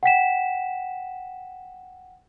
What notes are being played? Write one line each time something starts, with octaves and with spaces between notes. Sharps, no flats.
F#5 G5 B6 E7